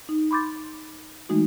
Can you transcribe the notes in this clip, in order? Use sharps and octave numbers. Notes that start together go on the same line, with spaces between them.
D#4
B5 C6 D6 G6 A6
E3 G#3 A3 D#4 F#4